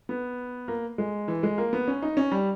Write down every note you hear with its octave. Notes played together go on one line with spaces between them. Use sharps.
B3
A#3
G#3
E3
G#3
A#3
B3
C#4
D#4
C#4
G3